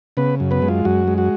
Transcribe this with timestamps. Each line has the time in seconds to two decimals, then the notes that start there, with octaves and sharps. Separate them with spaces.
0.17 C#3 B3 B4
0.40 F#2
0.51 B3 B4
0.62 G#3
0.68 F4
0.85 F#2 F#4
1.08 G#3
1.18 F#4